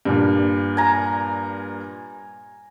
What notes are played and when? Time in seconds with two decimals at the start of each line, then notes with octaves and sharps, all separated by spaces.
0.05 G2 A#2
0.77 G#5 A#5